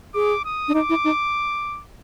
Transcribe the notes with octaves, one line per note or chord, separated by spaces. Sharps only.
G#4 D6
D#6
D4
D#4 D6
E4
D#4